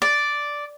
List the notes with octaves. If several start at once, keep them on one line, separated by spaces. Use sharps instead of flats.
D5